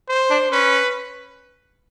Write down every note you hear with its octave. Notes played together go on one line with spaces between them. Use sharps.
C5
D4
C#4 B4